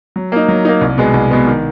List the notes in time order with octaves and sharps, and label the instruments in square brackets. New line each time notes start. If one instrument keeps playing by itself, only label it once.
[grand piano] F#3
A#3 D#4
F#3
A#3 D#4
C2
B2 G#3 B3
C2
B2 G#3 B3
D#3